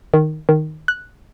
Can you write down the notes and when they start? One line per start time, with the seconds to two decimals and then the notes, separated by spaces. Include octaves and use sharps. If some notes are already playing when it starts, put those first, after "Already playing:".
0.14 D#3
0.49 D#3
0.88 F#6